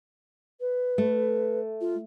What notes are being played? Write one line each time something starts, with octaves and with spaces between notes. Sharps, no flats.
B4
A3
F4